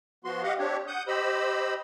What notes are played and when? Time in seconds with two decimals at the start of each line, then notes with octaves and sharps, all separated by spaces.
0.24 F3 B3 F#4 C6
0.43 G4 D#5 F5 F#5
0.59 C4 D4 G4 C#5
0.87 F#5 D#6 G6
1.08 G4 C5 D#5 B5 E6